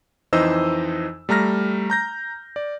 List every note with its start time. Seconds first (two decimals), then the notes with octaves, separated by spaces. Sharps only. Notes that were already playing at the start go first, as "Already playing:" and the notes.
0.33 F2 E3 D#4 C5 D#5 E6
1.29 G3 A3 A#5 F6 A#6
1.90 A#5 G6 A#6
2.56 D5